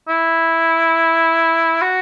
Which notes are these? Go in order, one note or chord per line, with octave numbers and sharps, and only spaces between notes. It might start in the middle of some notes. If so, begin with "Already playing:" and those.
E4
F#4